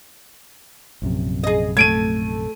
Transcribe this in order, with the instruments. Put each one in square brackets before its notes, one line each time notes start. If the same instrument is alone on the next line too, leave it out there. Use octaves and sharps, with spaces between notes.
[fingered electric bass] A#1 F#2 C3
[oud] G#4 D#5
[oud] A3 A4 [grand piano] G#6 D7 D#7